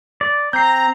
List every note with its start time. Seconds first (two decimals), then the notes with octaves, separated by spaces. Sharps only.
0.21 D5
0.53 C4 A#5 G6 C7